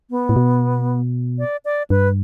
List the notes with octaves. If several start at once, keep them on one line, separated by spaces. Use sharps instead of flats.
B3
A2
B2
D5
D5
G2 B4